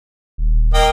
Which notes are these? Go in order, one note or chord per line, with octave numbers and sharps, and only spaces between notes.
D#1
A#3 D#5 G5